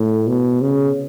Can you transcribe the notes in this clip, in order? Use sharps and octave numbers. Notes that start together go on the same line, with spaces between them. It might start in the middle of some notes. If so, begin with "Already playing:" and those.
Already playing: A2
B2
C#3